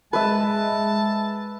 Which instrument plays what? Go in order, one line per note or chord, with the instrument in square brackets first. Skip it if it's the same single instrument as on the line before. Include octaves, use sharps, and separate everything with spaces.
[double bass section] G#3 [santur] B4 E5 [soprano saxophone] A5